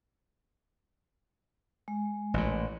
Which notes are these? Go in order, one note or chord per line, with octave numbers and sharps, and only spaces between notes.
G#3
A1 A#2